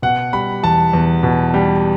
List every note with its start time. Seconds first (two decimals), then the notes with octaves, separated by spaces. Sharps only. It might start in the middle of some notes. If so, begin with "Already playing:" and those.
0.02 B2 F#5
0.33 G3 B5
0.63 E2 A5
0.93 E2
1.23 B2
1.54 G3